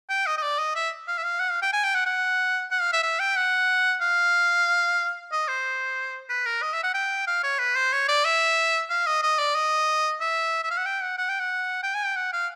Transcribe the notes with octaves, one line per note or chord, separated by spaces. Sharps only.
G5
D#5
D#5
D5
D#5
E5
F5
E5
F5
F#5
F5
G5
G#5
G5
F#5
F#5
F#5
F5
E5
E5
G5
F#5
F5
D#5
C5
B4
A#4
D#5
E5
F#5
G5
F5
C#5
B4
C5
C#5
D5
E5
F5
D#5
D#5
D5
D#5
E5
E5
F5
F#5
G5
F#5
F#5
G5
F#5
G5
G#5
G5
F#5
F5